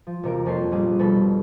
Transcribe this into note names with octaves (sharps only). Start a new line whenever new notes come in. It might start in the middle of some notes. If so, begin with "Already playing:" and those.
F3
E1 C3 A#4 D7
F2 A#3 C#4 A4 C7
A#1 G3 G#4 D6
F1 B2 A4 B5